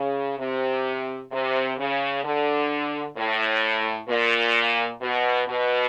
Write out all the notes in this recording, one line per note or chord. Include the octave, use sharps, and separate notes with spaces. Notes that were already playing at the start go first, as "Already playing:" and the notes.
Already playing: C#3
C3
C3
C#3
D3
A2
A#2
B2
B2